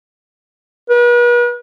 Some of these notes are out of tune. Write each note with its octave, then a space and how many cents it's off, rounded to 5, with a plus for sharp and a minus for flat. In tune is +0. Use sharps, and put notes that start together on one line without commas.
B4 -40